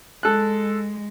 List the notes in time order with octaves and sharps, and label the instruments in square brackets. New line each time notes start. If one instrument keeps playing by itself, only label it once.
[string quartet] G#3 [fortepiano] A4 F#6